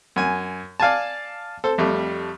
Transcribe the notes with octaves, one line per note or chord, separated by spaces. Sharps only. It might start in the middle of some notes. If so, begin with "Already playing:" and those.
F#2 G#5
D5 F5 G#5 A5
A4 C5
F2 G3 A3